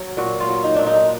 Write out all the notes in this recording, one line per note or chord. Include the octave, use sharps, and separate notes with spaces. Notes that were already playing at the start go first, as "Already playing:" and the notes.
Already playing: F#3
A#2 F#4
F4
F#3
D#4
A#2 D4
D#4